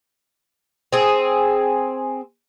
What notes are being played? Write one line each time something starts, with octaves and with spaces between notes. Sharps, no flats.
C4 G#4